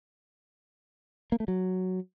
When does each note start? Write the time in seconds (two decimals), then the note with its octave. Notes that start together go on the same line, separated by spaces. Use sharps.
1.32 A#3
1.40 A3
1.48 F#3